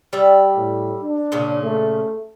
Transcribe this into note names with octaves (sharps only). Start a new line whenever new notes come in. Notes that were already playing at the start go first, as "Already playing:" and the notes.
G3 D5 E5
A2
D4
A#2 C#3 C#4
A3